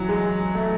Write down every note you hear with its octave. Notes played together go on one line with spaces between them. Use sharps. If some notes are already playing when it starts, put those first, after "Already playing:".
Already playing: E3 F#3
G#3
A3